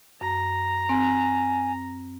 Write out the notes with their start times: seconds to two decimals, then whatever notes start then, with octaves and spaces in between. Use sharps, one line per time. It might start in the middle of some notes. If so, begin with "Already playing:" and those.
0.21 F#2 A#5
0.89 C4 G#5